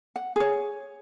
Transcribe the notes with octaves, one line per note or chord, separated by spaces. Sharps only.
F#5
G#4 C#5